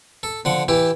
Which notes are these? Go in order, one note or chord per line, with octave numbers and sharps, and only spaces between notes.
A4
D3 F3 F#5
E3 E4 G4